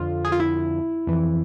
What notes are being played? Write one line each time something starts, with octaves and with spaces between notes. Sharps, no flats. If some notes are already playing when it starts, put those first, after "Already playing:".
Already playing: F2 D3 F3 F4
G#4
F4
E4
F2 E3